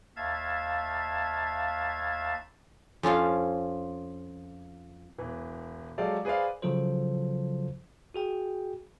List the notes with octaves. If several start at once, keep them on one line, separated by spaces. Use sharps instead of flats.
D#2 E5 F5 A5 G#6
F2 C#4 F4 F5
E1 E3
F#3 G#3 G4 A4 D5 F5
G#4 B4 C5 D5 F5
C#3 F3 F#3 F4 A4 C5
F#4 G#4 G5